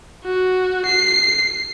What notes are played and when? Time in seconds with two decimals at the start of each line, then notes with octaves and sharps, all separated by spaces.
0.24 F#4
0.86 C7